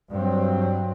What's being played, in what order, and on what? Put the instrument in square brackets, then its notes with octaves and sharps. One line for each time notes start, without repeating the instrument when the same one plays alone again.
[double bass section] G2 F#3 C4